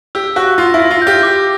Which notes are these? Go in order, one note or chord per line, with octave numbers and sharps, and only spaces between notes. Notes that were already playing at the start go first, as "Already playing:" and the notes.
G4 E6
F#4 B6
F4 A#6
E4
A#6
F4
G4 G6
D6